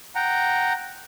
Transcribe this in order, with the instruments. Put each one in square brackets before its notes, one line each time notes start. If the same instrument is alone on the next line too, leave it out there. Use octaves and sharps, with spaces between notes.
[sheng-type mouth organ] F#5 G5 A#5